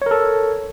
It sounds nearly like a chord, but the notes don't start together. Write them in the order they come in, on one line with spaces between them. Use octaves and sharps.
C#5 A#4 A4